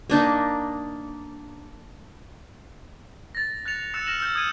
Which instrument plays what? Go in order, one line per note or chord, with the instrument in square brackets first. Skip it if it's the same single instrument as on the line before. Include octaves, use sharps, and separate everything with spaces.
[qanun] A#3 D4 D#4
[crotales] A6 A#6
F#6 A6 A#6 C#7 F7
E6 F#6 A6 C#7 E7
F6 A#6 E7 F#7
E6 F6 G6
D#6 G#6 D#7